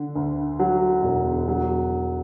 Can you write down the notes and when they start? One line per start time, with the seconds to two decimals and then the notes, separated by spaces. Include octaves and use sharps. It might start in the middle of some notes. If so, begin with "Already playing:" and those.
Already playing: D3
0.15 D2
0.59 F#3
1.03 E1
1.48 F#3